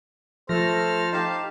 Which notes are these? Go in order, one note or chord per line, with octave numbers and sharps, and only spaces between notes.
F3 A3 A4 C5 F6 A#6
D#4 G4 F5 A5